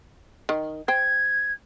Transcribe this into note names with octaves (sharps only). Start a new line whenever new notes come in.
D#3
C5 G5 G#6